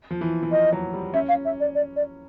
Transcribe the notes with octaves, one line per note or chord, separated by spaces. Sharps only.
F3
E3
E3
F3 D#5
F#3
G3
C#4 E5
F5
E5
D5
D5
D5